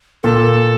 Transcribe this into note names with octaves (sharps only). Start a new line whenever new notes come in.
A#2 A4